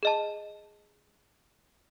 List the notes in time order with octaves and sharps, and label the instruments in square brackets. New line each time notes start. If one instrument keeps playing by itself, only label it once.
[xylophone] G#4 D#5 A5